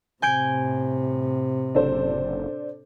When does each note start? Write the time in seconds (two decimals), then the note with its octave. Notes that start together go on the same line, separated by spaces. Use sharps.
0.22 A2 C3 G#5 G6 D7
1.75 F#1 D4 A4 C5